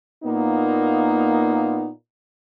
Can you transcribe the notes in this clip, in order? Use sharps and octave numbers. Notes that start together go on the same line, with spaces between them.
A#2 A#3 B3 D#4